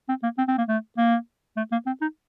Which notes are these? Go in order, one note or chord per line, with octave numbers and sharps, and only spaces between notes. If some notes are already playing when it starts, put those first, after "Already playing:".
C4
A#3
C4
C4
A#3
A3
A#3
A3
A#3
C4
D#4